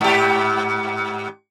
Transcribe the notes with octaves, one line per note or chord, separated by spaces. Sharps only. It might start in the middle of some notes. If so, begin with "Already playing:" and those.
G#2 G4